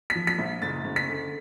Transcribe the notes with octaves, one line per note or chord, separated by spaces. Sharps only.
B6
F3
B6
A#1
F#1 A6
F#1
B6
D3